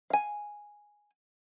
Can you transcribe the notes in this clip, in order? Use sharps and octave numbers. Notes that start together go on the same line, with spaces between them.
F5 G#5